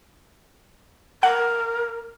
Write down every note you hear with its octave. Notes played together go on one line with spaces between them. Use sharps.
A#4 F#5